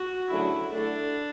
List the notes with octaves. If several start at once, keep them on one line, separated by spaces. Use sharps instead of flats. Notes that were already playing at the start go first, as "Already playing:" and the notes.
Already playing: F#4
D2 C#3 F#3 E4
D3 A3 D4 E4 A4